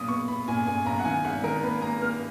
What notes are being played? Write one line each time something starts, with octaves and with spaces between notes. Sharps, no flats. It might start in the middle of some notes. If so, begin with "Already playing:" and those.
Already playing: B1 A#2 D#6
B3 C#6
B3 B5
A#2 G#5
A#2 G#5
B1 A#5
F#5
D#3 G#5
G#1 F#5
D#3 A#4
A#3 B4
A#3 A#5
A#3 F6